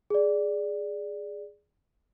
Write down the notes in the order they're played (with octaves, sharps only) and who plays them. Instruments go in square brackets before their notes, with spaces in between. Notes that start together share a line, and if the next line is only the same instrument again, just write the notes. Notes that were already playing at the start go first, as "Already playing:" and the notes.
[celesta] G#4 D5